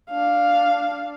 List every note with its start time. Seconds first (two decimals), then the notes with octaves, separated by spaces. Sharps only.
0.11 D4 F5